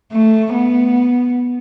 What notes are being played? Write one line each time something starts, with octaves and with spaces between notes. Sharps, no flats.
A3
B3